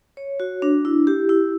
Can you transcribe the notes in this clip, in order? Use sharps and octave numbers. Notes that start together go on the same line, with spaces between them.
C#5
F#4
D4
E4
G4
E4